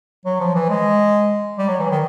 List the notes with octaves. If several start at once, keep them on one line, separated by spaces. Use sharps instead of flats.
F#3
F3
E3
G#3
G3
F#3
E3
D#3